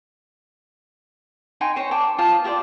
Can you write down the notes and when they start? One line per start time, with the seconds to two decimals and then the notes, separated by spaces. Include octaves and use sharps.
1.61 D#4 G5 G#5 C6
1.76 C5 C#5
1.91 G5 A5 D6
2.18 F4 C5 A5 D#6
2.44 F4 G4 C5 D5